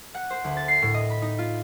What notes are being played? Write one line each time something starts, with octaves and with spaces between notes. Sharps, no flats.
F#5
C5
D2
A6
C7
A2
D#5
B5
D#4
F4